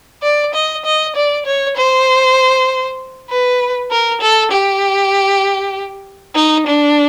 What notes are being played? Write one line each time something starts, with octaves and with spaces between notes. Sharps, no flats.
D5
D#5
D#5
D5
C#5
C5
B4
A#4
A4
G4
D#4
D4